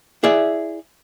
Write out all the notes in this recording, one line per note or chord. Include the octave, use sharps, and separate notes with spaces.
E4 G#4 D5 E5